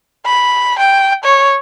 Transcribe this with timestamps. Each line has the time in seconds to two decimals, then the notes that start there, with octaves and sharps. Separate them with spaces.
0.25 B5
0.78 G5
1.24 C#5